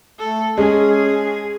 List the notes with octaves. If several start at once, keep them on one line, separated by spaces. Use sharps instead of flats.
A3 A4
G#3 C#4 G#4